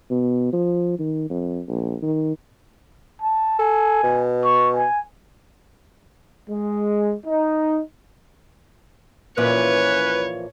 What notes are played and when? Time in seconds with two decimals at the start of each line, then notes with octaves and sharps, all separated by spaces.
0.10 B2
0.53 F3
0.99 D#3
1.30 F2
1.68 A#1
2.03 D#3
3.22 A5
3.59 A4 G#5
4.03 B2
4.44 C#6
4.75 G#5
6.49 G#3
7.25 D#4
9.38 A#2 E3 F3 C#4 B4 C#5